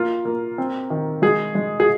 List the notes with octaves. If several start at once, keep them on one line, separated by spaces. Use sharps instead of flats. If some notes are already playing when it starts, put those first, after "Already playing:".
Already playing: A#3 F4
A#3
C4
D#3
G#3 G#4
G#3
G#4